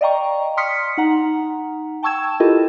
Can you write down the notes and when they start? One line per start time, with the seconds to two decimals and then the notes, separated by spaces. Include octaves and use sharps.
0.01 D5 D#5 F5 G5 A#5 C#6
0.57 C6 D#6 F6 B6 C#7
0.98 D#4 F#5 A#5
2.03 G5 A5 C#6 E6 G#6 E7
2.40 E4 F4 G4 A4 A#4 D#5